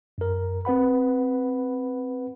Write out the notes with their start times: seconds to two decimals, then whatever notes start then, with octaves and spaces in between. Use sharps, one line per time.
0.18 F#2 A#4
0.65 C4 B4 F#5 B5